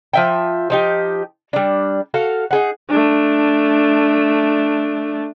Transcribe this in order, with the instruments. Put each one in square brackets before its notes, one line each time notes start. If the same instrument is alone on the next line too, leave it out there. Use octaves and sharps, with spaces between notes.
[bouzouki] F3 E5 G5
F3 D#4 G4
G3 D4
F#4 A4 F5
D#4 G#4 F#5
[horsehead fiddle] A3 D4